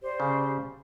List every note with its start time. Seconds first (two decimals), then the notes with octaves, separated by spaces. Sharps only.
0.02 G4 C5 D5
0.20 C#3